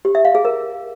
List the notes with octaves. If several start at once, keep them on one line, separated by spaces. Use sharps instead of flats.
G4
E5
F5
G#4
A#4